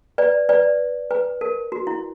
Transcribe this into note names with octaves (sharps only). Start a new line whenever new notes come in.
B4 D5
B4 D5
B4
A#4
F#4
E4